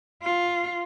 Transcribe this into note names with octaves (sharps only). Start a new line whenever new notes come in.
F4